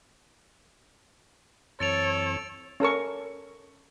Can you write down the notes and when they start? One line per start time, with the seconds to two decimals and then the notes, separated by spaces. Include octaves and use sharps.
1.80 F#2 E3 C4 A4 C#5 A6 D7 F7
2.80 C#4 A4 A#4 C#6